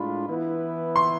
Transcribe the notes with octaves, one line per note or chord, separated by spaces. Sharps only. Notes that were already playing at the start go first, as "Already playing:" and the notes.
Already playing: A2 G#3 D4 F4 B5
E3 B3 E4 B4
C6